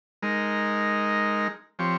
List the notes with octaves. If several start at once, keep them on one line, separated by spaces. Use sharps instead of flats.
G#3 D#4 A#4
F3 C4 G4 C#5